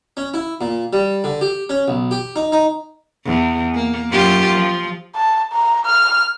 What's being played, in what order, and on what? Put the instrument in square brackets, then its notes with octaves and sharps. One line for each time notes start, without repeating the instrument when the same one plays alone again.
[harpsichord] C#4
E4
A#2
G3
D3
G4
C#4
B1
G4
D#4
D#4
[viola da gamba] E2
A#3
F#2 F4 G4
F3
[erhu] A5
A#5
F6